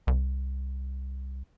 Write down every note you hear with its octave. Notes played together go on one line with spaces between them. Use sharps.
C2